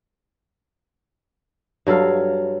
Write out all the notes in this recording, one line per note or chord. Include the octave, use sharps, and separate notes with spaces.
G2 F#3 A4 F5